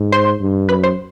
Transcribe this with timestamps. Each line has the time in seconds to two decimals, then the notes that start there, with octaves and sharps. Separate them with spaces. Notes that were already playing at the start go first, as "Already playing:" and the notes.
Already playing: G#2
0.12 C5 C6
0.41 G2
0.69 F#2 B4 B5
0.84 C5 C6